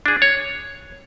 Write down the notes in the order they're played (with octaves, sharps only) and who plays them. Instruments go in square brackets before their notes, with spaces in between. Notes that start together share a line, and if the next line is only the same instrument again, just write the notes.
[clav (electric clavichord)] D4 G#4
C#5